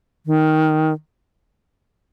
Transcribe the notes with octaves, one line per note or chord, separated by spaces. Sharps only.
D#3